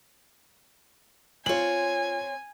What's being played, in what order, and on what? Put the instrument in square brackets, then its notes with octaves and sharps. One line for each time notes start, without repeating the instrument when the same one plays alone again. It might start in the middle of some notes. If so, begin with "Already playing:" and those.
[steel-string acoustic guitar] C4 C#5 [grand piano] F4 F#7 [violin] G#5